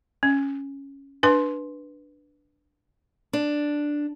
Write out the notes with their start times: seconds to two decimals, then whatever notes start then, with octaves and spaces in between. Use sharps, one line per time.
0.23 C#4
1.23 D4 B4 C6
3.33 D4